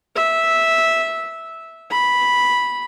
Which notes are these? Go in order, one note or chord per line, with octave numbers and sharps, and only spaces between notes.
E5
B5